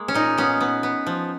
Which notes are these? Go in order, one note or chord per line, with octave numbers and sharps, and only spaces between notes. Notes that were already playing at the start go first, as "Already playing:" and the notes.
Already playing: G#3 A#3
C#4
A#2 D#4
B3 C#4
B3
B3
F3